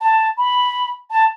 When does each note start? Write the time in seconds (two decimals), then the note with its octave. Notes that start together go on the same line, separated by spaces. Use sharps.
0.01 A5
0.38 B5
1.10 A5